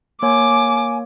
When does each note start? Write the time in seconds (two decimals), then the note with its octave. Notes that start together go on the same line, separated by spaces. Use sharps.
0.23 A#3 C#5 G#5 D6